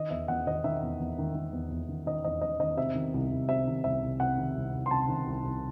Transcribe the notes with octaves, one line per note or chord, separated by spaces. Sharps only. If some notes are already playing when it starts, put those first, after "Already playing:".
Already playing: D#3 D#5
E2 E5
E2 F#5
D#3 D#5
D#3 E5
E2
E2
D#3
D#3
E2
E2
D#3
D#3 D#5
E2 D#5
E2 D#5
D#3 D#5
C3 E5
D#3
C2
C2
C3 E5
D#3
C2 E5
C2
C3 F#5
D#3
C2
C2
C6
C3 A5
D#3
C2
C2